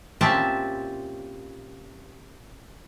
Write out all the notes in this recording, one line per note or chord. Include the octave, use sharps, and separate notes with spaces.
A#2 C4 C#4 G4 E5 A5